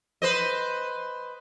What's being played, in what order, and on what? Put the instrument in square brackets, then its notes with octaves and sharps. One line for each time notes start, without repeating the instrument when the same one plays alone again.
[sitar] B4 C5 D#5